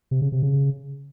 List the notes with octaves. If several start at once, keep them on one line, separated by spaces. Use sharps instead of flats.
C3
C#3
C3
C#3